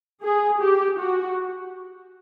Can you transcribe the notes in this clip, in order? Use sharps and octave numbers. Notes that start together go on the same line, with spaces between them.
G#4
G4
F#4